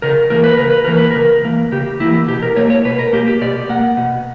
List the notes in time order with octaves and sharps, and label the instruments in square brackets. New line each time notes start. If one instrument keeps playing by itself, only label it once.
[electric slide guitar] C#3 A#4
E3 A#3 A#4
B4
C#3 A#4
B4
E3 A#3 A#4
B4
C#3 A#4
E3 A#3
C#3 G4
E3 A#3 E4
B2 G4
A#4
A#3 C#5
C#5
B2 B4
A#4
A#3 G4
G4
B2 D5
A#3 F#5
B2